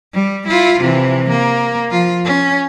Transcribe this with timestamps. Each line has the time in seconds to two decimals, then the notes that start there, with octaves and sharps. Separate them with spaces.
0.13 G3
0.47 E4 F4
0.80 C3 E3
1.29 A#3
1.90 F3 F4
2.25 C#4